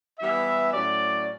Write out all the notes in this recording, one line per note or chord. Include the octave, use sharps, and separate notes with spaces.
E3 G3 B3 E4 E5
A2 F#3 C#4 D5